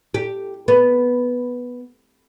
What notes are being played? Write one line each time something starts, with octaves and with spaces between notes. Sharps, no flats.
G4
B3